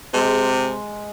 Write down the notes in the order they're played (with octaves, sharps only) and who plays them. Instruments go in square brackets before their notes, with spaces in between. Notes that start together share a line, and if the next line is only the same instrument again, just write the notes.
[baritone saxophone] C3 [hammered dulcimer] G#3